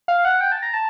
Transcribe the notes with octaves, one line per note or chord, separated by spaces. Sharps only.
F5
F#5
G5
A5
A#5
A5